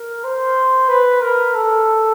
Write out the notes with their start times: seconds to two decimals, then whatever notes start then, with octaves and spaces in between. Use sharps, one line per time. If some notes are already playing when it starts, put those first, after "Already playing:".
Already playing: A#4
0.24 C5
0.89 B4
1.21 A#4
1.54 A4